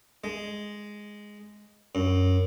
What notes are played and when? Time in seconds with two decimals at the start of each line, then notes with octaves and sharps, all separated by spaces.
0.24 G#3
1.95 F#2